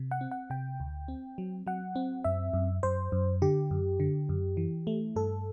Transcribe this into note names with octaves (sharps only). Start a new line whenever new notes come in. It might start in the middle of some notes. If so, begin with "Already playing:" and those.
Already playing: C3
F#5
C4
F#5
C3 G5
D2
C4
F#3
F#3 F#5
C4
F#2 E5
F#2
F#2 C5
F#2
D3 G4
F#2
D3
F#2
E3
A3
G2 A4